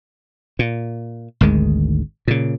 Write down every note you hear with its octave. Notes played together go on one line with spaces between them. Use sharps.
A#2
G#1 D2 D#3 G#3
A#2 C#3